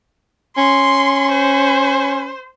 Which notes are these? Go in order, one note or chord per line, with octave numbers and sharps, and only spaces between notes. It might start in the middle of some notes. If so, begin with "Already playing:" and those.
C#4 C6
C5